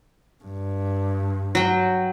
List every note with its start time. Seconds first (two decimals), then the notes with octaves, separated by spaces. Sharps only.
0.45 G2
1.55 F#3 G5